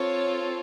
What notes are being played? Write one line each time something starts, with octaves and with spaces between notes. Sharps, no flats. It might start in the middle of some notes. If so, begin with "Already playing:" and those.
Already playing: C4 F4 A4 C#5